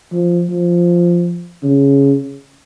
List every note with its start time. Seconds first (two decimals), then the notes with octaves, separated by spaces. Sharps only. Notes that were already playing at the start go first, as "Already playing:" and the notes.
0.12 F3
0.50 F3
1.63 C#3